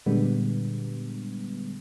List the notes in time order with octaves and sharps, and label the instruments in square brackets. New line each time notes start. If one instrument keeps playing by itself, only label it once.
[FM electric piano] A#2 D3 G3 G#3 B3